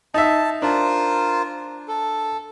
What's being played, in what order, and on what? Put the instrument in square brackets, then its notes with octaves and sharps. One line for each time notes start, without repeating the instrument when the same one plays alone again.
[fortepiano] D#4 E5 [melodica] A5
[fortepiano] D4 [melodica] F4 A#4 C5
[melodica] A4